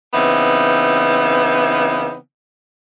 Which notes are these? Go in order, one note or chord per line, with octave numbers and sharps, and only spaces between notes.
C#3 E3 B3 C4 D#4